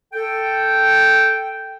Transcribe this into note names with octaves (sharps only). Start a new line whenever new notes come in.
A4 G5